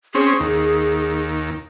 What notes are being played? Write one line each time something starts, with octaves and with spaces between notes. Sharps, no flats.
C4 C#4 G#4
D#2